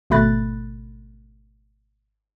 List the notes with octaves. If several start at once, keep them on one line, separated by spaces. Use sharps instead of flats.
G#1 B2 A3 B5 F#6 A6